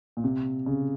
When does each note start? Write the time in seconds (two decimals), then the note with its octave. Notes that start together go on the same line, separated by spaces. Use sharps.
0.17 A#2
0.24 C3
0.66 C#3